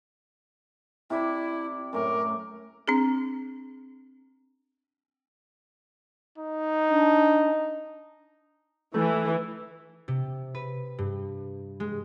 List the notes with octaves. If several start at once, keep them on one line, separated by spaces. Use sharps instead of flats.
C3 E4 D5 B5
F#2 A2 A#4 D6
C4 D4 G#4
D#4
D4
E3 A3
C3
B4
G2
G#3